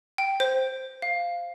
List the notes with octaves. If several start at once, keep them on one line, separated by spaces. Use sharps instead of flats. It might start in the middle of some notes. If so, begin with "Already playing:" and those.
G5
C5
F5